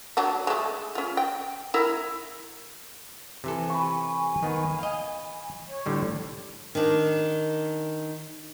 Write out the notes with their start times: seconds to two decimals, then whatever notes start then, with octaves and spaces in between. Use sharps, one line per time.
0.17 F#3 D4 F#5
0.47 G#3 A3
0.95 C#4 F4
1.17 G5
1.74 E4 A#4
3.44 C3 E3 A4 G#5
3.70 B5 C#6
4.43 D#3 B3
4.79 D#5 F5
5.67 C#5
5.86 A2 D3 G3
6.75 D#3 D4